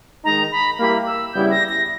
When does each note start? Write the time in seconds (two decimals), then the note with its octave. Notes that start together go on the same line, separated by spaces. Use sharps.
0.25 D#3 G#3 D#4 A#5
0.52 B5
0.79 G3 A#3 E4 G4 A#4 B5
1.06 E6
1.33 C#3 G3 B3 E4 G4 G6
1.51 A#6
1.69 A#6